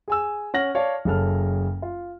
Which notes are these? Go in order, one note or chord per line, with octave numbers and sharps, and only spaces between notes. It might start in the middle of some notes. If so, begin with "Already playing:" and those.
G#4 G#5 E6
C#4 F#5 F6 A#6 F#7
C#5 D5 F5 A5
F#1 C#3 A4 F6
F4